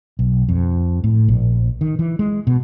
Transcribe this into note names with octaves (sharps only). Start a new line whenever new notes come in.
B1
F2
A2
A#1
D#3
E3
G#3
B2